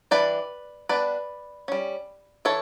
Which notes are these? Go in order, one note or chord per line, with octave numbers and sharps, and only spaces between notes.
E3 G3 D4 B4 D5
G3 B3 D4 B4 D5
G3 C#4
E3 A4 C#5